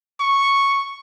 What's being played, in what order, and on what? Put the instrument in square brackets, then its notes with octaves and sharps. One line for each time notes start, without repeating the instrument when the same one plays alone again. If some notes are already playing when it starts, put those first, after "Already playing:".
[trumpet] C#6